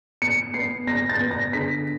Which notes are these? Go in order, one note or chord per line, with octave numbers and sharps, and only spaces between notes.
B3 C#7
B3 C7
B3 A#6
A6
B3
A#6
D3 B6